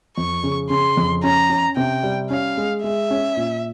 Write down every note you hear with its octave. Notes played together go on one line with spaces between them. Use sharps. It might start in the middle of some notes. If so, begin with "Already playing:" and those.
F2 C#6
C#3
C#3 C6
F2
C#4 A#5
C#4
C3 G5
G3
C#4 F5
G#3
G#3 E5
C#4
A#2